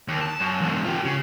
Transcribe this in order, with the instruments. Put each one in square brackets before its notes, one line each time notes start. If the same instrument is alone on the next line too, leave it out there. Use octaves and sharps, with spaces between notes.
[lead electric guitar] D#2
A5
F#2
E2 G#2
F4 G4
C#3